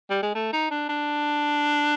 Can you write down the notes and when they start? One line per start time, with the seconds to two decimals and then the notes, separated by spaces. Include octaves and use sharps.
0.10 G3
0.23 G#3
0.35 A3
0.53 D#4
0.71 D4
0.89 D4